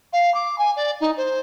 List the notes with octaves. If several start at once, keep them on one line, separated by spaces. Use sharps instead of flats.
F5
D6
G#5
D5
D#4
C5